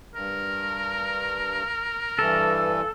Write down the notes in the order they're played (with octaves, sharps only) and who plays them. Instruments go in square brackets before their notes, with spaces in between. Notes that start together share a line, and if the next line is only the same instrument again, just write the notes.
[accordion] G2 [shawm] A#4
[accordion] G2 E3 [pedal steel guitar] A4